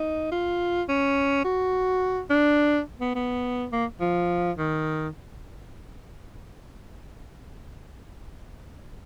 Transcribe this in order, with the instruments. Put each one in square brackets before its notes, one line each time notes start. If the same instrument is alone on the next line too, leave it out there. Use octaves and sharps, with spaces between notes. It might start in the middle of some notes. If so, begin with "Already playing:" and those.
Already playing: [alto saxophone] D#4
F4
C#4
F#4
D4
B3
B3
A#3
F3
D#3